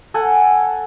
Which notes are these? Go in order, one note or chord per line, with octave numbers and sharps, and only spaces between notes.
A4 F#5 G#5